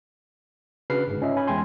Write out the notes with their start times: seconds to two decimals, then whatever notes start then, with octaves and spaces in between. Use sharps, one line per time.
0.90 C#3 D4 F#4 B4 F6 C7
1.07 G1 G#2
1.22 C#4 F4 D#5 E5
1.36 C#4 G#5 B5
1.47 E2 G#3 G5 G#5 C6